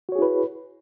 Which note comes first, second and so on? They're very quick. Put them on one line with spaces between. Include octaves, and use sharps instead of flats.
F#4 C#5 G#4 E4 B4